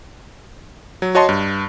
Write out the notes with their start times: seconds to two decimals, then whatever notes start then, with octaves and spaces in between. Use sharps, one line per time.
1.02 F#3
1.15 F#4 C#5 D#5 A5 C6
1.29 G2